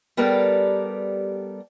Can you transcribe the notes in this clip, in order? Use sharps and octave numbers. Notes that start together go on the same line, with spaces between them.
G3 B3 G4 A4 A#4 D5